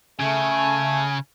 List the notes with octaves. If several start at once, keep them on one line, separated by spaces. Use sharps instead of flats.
C#3 A3 G#5